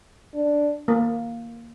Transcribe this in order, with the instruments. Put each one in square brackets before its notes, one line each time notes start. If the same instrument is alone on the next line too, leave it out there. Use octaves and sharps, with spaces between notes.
[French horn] D4
[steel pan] A#3